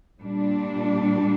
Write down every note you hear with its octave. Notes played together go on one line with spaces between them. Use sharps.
A#2 G3 D4